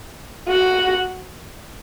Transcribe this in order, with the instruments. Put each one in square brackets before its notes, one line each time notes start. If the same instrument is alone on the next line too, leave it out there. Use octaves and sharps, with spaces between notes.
[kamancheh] F#4